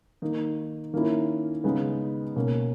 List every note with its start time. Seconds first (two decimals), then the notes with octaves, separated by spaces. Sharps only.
0.22 D#3 A#3 D#4
0.94 D#3 A#3 C#4 E4
1.64 C#3 G#3 B3 D#4
2.36 B2 A#3 C#4